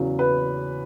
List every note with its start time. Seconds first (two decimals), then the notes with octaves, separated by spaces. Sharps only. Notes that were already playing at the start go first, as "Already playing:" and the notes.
Already playing: E2 C#3 F#3
0.19 B4